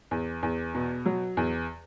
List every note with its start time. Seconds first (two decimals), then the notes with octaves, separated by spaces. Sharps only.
0.11 E2
0.43 E2
0.75 B2
1.06 F#3
1.37 E2